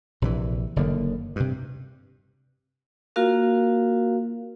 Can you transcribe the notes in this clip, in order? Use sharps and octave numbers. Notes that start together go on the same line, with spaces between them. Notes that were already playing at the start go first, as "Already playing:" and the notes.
A#1 C3 D#3 E3
F#1 D3 D#3 A#3
G2 C3
A#3 F4 F#4 A#4 F5